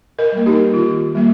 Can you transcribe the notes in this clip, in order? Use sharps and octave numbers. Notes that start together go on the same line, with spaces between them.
A#4 D#5
G3 A#3
D#4 G4
D#3 F4
G3 A#3